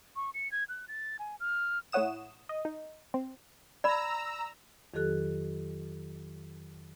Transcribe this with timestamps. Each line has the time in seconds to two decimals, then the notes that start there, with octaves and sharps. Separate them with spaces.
0.16 C#6
0.34 C#7
0.52 G#6
0.69 F#6
0.88 A6
1.19 G#5
1.40 F6
1.92 A2 E4 C#5 F#5 D#6 E7
2.49 D#5
2.65 D#4
3.14 C4
3.84 D5 A#5 B5 E6
4.94 F2 D#3 F#3 G4 A4 F#6